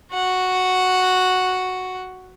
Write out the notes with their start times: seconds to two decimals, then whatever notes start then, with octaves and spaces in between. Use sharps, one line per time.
0.13 F#4 F#5